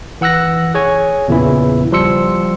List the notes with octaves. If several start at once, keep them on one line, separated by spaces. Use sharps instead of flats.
E3 F#5 E6 F#6 A#6
G#4 C#5 G#5
E2 A#2 C#3 E3 E4
F3 G3 C6 E6 C#7